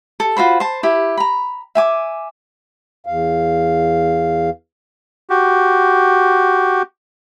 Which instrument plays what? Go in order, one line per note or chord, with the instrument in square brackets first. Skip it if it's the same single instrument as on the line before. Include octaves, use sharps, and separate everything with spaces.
[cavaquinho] A4
F4 F#4 C5 B5
C5 A5
E4 G4
A#5 B5
E5 G#5 D6
[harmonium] E2 F5
[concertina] F#4 G4